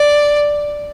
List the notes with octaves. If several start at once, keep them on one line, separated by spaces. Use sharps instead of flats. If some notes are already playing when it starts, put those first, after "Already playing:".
Already playing: D5